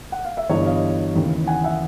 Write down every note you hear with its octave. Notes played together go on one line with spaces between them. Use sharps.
F#5
F5
E5
G1 G2 E3 C#5 D#5
D#5 F5
D#2 C#3 E3
F#5 G#5
E5 F#5